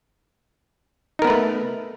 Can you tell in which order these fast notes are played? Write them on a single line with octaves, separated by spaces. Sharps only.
D#4 A#4 B3 B4 A3